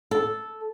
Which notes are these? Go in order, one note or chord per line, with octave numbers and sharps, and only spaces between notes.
A4